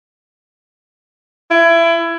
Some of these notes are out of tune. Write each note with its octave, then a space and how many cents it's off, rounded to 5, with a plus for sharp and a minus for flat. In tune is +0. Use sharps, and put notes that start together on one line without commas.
E4 +25